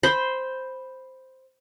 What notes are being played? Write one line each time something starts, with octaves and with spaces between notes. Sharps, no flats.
C5 B5